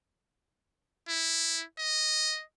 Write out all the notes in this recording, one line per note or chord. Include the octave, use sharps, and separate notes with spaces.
E4
D#5